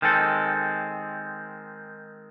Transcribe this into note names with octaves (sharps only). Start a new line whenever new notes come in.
D#3 G#3 C4 A4